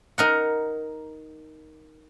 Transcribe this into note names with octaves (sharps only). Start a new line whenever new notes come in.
D#4 A#4 F#5